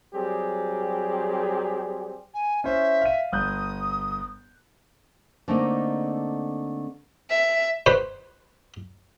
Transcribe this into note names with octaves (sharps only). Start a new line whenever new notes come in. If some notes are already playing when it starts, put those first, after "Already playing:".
F#3 G3 C4 G4 G#4
G#5
C#4 E4 C5 E5
F5 D#7
G1 D#6 F#6 G6
D3 A3 A#3 C4 D#4
E5
B4 C5